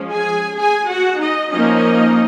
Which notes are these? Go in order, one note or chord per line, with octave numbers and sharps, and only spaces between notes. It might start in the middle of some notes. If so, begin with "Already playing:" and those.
Already playing: F3 G#3 C#4
G#4 G#5
G#4 G#5
F#4 F#5
D#4 D#5
F3 A#3 C#4 D#4 D#5